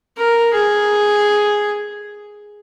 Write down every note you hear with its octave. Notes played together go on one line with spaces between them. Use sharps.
A#4
G#4